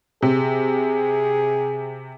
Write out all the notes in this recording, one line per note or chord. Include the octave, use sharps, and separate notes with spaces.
C3 G#4